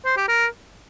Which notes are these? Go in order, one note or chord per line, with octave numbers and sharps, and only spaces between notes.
C5
G4
A#4